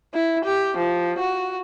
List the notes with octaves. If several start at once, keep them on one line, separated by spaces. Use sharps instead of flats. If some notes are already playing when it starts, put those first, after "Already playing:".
E4
G4
F3
F#4